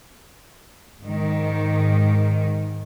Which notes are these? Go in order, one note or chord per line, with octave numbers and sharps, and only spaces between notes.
G#2 D#3